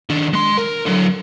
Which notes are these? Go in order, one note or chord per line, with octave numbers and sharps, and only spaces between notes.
D#3 D4
G#3 C6
A#4
D3 F#3